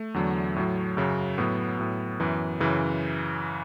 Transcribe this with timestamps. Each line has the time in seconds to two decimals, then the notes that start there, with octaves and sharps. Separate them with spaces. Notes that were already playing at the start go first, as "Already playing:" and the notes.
Already playing: A3
0.14 E2 D3 F#3
0.56 A2 F#3
0.97 F#2 C#3 F#3
1.38 A2 F#3 B3
1.79 A2 F#3
2.20 F#2 E3
2.60 F#2 C#3 E3